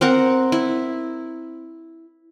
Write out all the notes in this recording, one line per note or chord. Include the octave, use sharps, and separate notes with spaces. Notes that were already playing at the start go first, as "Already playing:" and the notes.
C4 A#4 F#5
E4